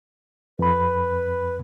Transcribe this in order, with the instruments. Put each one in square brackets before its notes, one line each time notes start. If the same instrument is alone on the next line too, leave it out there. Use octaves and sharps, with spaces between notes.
[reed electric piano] F2 B5 [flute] B4